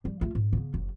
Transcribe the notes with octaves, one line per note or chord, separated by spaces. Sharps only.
F3 G3
A3 F4
G#2
C#3 B3
F#1